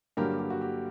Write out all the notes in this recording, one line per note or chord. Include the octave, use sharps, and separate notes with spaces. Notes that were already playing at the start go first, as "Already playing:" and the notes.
G2 D3 F#3 A#3 G4 A#4
G4
F#4
G4